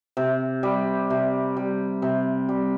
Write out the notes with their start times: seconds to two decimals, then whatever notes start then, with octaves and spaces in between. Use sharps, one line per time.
0.17 C3
0.63 G3
1.10 C3
1.57 G3
2.02 C3
2.49 G3